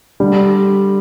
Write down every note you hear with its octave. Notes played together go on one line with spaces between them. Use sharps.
D3 G3